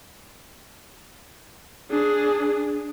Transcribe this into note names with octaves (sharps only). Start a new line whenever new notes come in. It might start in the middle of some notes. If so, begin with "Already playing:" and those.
D4 G#4